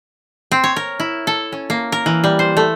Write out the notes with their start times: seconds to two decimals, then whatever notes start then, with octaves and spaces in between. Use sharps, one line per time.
0.52 C4
0.64 C#5
0.76 A#4
1.00 E4
1.27 A4
1.52 C#4
1.70 A#3
1.92 A#4
2.06 E3
2.24 G3
2.39 C5
2.57 A3